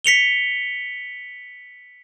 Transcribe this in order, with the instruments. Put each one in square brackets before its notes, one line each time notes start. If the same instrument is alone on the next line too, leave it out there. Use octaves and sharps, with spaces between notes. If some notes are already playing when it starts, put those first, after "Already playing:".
[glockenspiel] B6 C#7 F7 G7